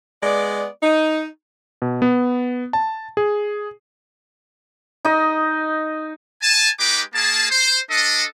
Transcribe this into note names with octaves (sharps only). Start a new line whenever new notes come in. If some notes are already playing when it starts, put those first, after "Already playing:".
G#3 B3 D5
D#4
B2
B3
A5
G#4
D#4 D#5
G#5 A5
G#3 D#4 G4 B4 G5 D6
A#3 G#4 A5
C5
D4 A4 D#5